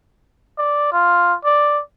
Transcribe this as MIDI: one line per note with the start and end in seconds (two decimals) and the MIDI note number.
0.58 0.90 74
0.92 1.35 65
1.44 1.81 74